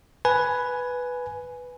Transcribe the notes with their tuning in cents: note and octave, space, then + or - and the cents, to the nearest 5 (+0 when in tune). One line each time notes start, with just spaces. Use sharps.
B4 +0 G#5 +10